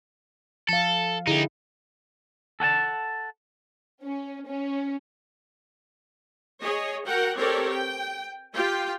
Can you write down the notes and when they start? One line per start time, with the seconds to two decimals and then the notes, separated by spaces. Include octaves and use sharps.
0.69 F3 A4 F5
1.27 D3 D#4 E4 G4 G#4
2.60 A4 F#5 G#5 A5
4.03 C#4
4.47 C#4
6.60 G#4 C#5 D#5
7.06 F#4 A#4 F#5 G5
7.37 C4 G4 A4 A#4 C#5 D5
7.70 G5
8.54 F4 G4 G5